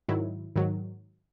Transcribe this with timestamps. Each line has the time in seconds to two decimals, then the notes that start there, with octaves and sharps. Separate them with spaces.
0.09 G#2 D#3 F#3 E4
0.56 G#2 D#3 F#3